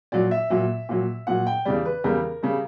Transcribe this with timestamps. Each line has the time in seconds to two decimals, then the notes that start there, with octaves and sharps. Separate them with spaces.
0.12 A#2 F#3 D5
0.31 E5
0.50 A#2 F#3
0.89 A#2 F#3
1.27 A#2 F#3 F#5
1.47 G5
1.65 E2 C#3 G3 D5
1.85 B4
2.04 E2 C#3 G3 A#4
2.43 C#3 G3